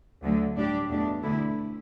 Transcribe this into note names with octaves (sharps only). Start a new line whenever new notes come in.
D2 D3 F#3 A3
A2 G3 D4 G4
E2 B2 A3 D4
D2 D3 A3 E4